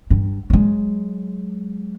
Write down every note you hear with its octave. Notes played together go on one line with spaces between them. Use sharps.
G2
F#3 G#3